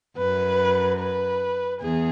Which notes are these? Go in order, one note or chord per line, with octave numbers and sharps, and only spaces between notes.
F#2 B4
B4
E2 G#4